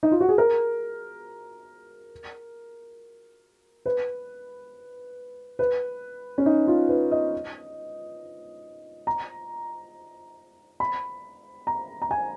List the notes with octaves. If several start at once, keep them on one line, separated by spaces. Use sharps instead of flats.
D#4
F4
F#4
G#4
A#4
B4
B4
C#4
D#4
F4
B4
D#5
A#5
B5
A#5
A#5
G#5